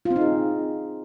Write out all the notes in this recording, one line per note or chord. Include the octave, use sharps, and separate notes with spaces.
F4
C4
D#4
G#4